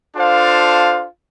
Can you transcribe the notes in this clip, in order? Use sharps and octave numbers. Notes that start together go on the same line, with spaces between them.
D4 F4 A4 C5 F5